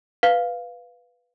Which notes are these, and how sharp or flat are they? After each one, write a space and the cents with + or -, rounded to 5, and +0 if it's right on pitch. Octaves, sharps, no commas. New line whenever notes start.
B4 +0 F5 +0